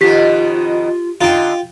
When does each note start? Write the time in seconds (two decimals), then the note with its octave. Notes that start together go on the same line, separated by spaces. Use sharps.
0.01 F2 B2 D#3 F4 G4 B6
1.21 D3 D#4 F4 G5